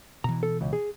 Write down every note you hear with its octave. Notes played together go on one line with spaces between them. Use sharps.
B2 E3 A#5
A4
C#2
G#4